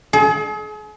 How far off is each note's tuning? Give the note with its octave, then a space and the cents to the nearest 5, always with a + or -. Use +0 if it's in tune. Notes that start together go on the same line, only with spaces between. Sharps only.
G#4 +40